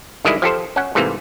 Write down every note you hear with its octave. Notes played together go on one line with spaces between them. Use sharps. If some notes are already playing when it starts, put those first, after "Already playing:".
D3 D#3 G3 G#3 E4
F3 G4 A4 C5
C#4 F#5
G#2 C3 E3 A3 A#3